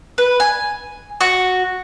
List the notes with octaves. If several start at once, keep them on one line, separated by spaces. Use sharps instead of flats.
B4
G#5
F#4